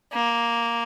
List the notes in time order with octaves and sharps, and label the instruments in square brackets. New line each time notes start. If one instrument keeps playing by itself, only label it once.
[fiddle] A#3